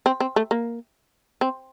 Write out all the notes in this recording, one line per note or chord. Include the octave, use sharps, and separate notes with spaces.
C4
C4
A3
A#3
C4